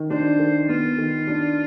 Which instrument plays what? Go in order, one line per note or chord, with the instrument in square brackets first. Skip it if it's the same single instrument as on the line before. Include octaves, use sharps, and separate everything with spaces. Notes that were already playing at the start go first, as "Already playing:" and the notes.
Already playing: [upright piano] D#3
[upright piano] D4 [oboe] C5
[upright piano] D#3
[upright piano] B3 [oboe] F4
[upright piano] D#3
D4